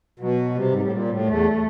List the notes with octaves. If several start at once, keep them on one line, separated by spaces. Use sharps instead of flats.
B2 F#3
C3 G3
G#2
A2
A#2
A2
E2 A3